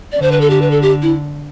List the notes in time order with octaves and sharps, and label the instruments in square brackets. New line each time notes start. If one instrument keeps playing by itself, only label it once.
[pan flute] D5
[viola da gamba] D3 [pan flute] C5
[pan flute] B4
A4
G4
B4
A4
G4
E4